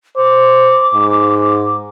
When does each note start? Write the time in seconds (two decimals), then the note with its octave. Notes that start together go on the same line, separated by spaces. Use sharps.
0.17 C5 D6
0.94 G#2